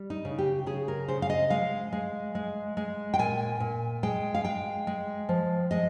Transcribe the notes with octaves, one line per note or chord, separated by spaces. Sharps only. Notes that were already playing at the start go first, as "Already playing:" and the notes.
Already playing: G3
D#4
C#3
G4
C#3 G#4
A#4
C#3 C5
F5
D#5
G#3 F5
G#3
G#3
G#3
G5
A#2 G#5
A#2
G#3 G5
F5
G#3 G5
G#3
F3
G#3 D#5